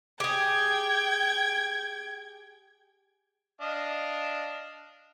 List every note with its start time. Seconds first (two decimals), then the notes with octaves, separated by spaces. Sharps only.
0.20 G4 G#4 G5 G#6
3.61 D4 D#5 F5